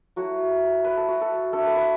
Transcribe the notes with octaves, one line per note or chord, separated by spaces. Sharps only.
F#3 A3 E4 F#4
B4
A4
F#4
A4
A3 D4 A4
B4
B4